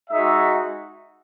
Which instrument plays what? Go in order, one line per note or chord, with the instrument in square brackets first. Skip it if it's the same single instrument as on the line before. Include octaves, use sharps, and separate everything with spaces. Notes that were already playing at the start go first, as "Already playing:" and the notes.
[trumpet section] G#3 D#4 F#4 E5